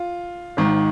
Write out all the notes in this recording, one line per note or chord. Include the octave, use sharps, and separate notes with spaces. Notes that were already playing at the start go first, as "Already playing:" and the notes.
Already playing: F4
G#1 G#2 D#3